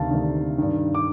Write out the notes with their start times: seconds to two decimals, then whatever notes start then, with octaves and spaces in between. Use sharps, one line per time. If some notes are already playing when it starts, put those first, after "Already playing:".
Already playing: D2 C3 D#3 F5 A5
0.11 D2 C3 D#3
0.58 G2 D#3
0.95 D6